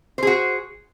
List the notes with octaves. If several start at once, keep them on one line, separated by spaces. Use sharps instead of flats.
F#4 G#4 C5